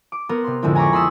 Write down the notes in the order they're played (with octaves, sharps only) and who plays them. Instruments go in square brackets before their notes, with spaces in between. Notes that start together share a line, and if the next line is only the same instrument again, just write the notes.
[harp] D6
B3 A#4 C5
C3 C6
F2 A2 D3 G#3 C4 E4
G#5 A#5 B5 C#6 D6
B5 C6 D#6 E6 G#6 A6